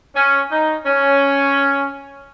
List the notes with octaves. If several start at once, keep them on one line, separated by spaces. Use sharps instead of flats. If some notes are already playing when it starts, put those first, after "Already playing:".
C#4
D#4
C#4